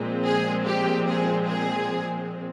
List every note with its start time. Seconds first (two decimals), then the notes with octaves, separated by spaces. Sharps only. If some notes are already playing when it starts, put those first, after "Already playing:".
Already playing: A#2 F3 G#3 C4
0.24 G#4
0.65 G4
1.06 G#4
1.46 G#4